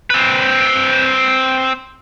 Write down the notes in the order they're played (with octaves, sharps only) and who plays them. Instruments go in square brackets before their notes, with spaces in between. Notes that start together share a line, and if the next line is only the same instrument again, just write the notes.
[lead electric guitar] C4 B4